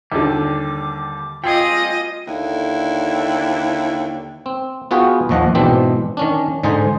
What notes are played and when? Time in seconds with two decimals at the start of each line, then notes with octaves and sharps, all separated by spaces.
0.12 D#2 D3 G3 D6
1.44 G3 C4 F4 G#4 D#5 G5
2.27 D#2 D3 E4
4.46 C4
4.91 B3 F4 F#4 G#4 B4 G5
5.29 A#1 D#2 F3 D#5 F#5
5.55 G#2 B2 E3 C4 D4 G4
6.17 D#3 C#4 D4
6.63 G#2 D3 D#4 G#4 C5 G#5